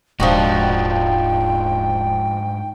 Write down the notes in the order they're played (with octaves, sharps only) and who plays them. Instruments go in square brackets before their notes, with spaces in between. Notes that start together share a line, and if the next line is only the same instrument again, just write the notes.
[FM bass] D#1 [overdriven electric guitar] G#2 D4 [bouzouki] F3 D#4 F#4 [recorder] G5